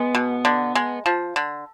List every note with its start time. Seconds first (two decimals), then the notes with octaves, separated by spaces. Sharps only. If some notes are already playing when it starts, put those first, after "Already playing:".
Already playing: G#3 B3
0.15 B2
0.45 D3
0.75 G#3
1.06 F3
1.36 D3